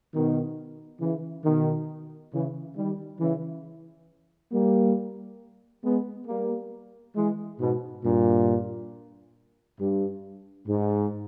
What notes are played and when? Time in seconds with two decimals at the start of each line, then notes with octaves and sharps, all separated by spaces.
0.13 B2 D#3
1.01 C#3 E3
1.45 B2 D#3
2.32 C#3 E3
2.76 D#3 G3
3.20 C#3 E3
4.52 G3 A#3
5.84 G#3 B3
6.27 G3 A#3
7.15 E3 G#3
7.59 G#2 B2
8.03 G2 A#2
9.78 G2
10.67 G#2